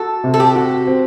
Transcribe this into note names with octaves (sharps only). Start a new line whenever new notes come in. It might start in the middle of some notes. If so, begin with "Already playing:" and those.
Already playing: F#4 A4
C3
A4
G4
F#4
C4